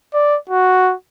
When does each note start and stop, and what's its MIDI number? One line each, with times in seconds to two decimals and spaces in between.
0.14 0.37 74
0.50 0.94 66